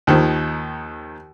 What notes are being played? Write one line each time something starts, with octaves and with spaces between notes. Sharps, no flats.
D#2 D#3 F3